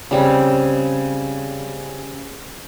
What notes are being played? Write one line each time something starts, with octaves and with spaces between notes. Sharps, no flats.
C#3 G3 C4